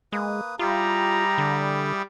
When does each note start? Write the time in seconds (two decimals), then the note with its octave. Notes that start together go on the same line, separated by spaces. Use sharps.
0.12 G#3 A#3 B4 D#6
0.59 G3 E4 F4 G4 G#4 A#5
1.38 D3